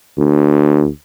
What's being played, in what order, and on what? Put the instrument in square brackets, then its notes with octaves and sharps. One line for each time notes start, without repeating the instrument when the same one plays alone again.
[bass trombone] D2